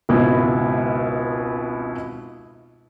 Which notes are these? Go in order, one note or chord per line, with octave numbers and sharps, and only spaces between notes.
G#1 C#2 B2 E4